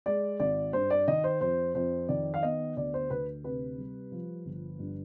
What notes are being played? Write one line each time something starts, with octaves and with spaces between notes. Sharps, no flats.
G#3 D5
G#1 D5
G2 C5
D5
D#3 D#5
C5
F2 C5
F2 C5
D#3 D5
F5
B3 D#5
D2 D5
C5
D2 B4
C3 B4
G3
F3
G1
G2